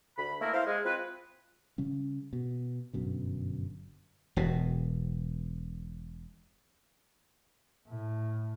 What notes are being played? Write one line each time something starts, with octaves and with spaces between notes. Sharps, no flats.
D2 B5
A3 A#3 C4 E4 A#4
E4 C5 F5
G#3
C4 F4 B4
C#3 G3 C#4
B2
G1 F#2 B2 D3
E1 B2
A2